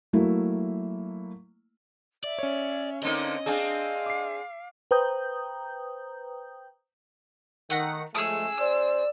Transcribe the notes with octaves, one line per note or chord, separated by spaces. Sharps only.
F#3 A3 A#3 E4
D5 E5
C#4 C#5
D3 A#3 C4 D#4 D#5
C4 D4 G#4 F5
D6 C7
B4 C5 G5 A#5 D#6 G6
D#3 A3 F#5 A#5
F3 G#3 A3 C#4 G#4 E6
C5 D5